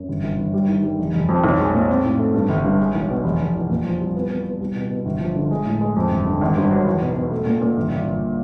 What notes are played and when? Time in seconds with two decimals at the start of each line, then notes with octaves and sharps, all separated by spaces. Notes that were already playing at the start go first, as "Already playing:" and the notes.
Already playing: F#2
0.09 G1
0.23 G1
0.38 G1
0.53 G3
0.68 D#3
0.83 G3
0.99 F1
1.14 F1
1.29 F2
1.44 B1
1.59 G#3
1.74 A#2
1.89 C4
2.04 A2
2.19 A3
2.34 G2
2.49 G1
2.64 G2
2.80 G#3
2.94 B1
3.10 B2
3.24 F1
3.40 F1
3.55 E2
3.70 A#2
3.85 F3
4.00 C2
4.16 B3
4.30 B3
4.45 B3
4.60 C2
4.75 B2
4.90 B2
5.06 G1
5.20 F3
5.36 D3
5.51 G#3
5.65 A2
5.81 G#3
5.96 F2
6.11 G1
6.26 D3
6.41 G#1
6.56 G2
6.71 F#3
6.86 E2
7.01 B2
7.16 B2
7.31 A3
7.46 A#2
7.61 A#2
7.77 G1
7.92 G1
8.07 G1